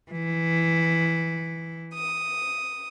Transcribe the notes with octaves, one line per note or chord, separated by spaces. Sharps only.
E3
D#6